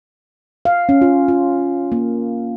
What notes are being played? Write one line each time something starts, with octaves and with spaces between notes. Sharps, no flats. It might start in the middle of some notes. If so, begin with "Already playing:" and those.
F5
C#4
F4
F4
A#3